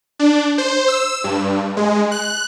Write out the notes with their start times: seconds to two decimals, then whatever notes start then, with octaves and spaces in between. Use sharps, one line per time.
0.19 D4
0.58 C5
0.88 E6
1.24 G2
1.77 G#3
2.11 F#6